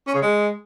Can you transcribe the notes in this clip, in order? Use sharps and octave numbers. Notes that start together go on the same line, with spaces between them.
C#4
C#3
G#3